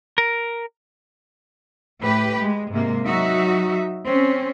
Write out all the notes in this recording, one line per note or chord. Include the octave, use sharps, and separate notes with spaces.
A#4
A2 G4 B4
G#3
G#2 C3 A#3
F#3 D#4 F#4 E5
C4 C#4